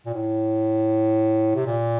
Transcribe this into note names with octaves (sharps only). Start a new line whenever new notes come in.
A#2
A2
C3
A#2